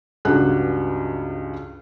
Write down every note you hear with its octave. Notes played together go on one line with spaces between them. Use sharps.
C#2 G2 G3 F#4 F#6